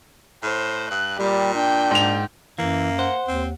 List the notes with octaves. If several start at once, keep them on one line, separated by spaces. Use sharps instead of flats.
A2 C5
G2 F#6
A#2 G3 G4
D4 G5
G#2 F7
F#2 E3 A#3
C5 F#5
D#2 C4